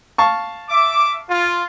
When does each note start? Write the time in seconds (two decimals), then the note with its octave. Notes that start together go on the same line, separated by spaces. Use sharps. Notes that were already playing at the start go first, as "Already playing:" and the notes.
0.18 F5 A5 C#6
0.70 E5 D6
1.30 F4